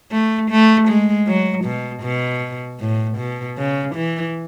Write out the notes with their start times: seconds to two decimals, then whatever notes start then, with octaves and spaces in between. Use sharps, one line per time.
0.12 A3
0.51 A3
0.88 G#3
1.27 F#3
1.65 B2
2.03 B2
2.80 A2
3.18 B2
3.57 C#3
3.95 E3